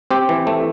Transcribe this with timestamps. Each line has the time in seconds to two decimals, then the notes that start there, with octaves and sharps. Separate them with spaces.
0.11 C4 G4
0.29 E3
0.47 A3